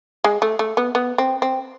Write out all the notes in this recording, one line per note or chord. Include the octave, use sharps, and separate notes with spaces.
G#3
A3
A3
B3
B3
C4
C4